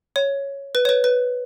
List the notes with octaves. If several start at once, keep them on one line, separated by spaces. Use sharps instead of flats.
C#5
B4
C#5
B4
B4